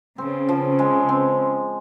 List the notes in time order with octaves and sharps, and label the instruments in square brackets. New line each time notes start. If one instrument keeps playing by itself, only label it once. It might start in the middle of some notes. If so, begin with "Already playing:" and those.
[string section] C#3 [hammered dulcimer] C4
[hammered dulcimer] F3
G#3
C4